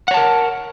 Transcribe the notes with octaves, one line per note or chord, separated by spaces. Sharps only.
A#4 C#5 F#5 A5